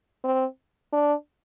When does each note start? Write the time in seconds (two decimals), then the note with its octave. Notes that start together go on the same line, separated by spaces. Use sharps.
0.24 C4
0.93 D4